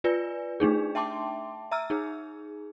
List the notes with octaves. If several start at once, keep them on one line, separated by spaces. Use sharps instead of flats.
F4 B4 D5 G#5
A3 D4 D#4 G#4
E5 G5 A5 C6 D6
E5 A#5 E6 F6
D#4 G#4